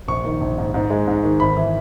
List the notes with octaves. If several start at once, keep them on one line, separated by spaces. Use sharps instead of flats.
A#1 C#6
D#3
A#1
G#2
G#2
G#3
G#2
D#3
G#1 B5
E3